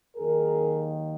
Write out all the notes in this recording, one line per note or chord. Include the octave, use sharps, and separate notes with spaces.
D#2 D#3 F#3 G#4 A#4